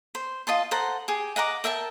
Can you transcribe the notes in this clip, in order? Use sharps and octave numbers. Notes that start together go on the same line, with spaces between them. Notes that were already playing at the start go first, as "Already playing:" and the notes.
C5
F4 D#5 A5 C6
A4 C5 F#5 A#5
G4 G#4
D#5 F#5 A#5 D6
A#4 E5 G5 A5